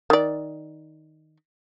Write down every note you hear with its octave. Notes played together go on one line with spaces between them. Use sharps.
D#3 D5